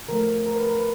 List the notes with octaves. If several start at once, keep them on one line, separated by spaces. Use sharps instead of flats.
D3 F3 A3 A#4
A#4
B4
A#4
B4